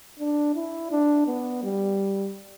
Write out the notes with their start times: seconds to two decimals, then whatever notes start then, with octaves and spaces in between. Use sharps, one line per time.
0.20 D4
0.55 E4
0.91 D4
1.27 B3
1.64 G3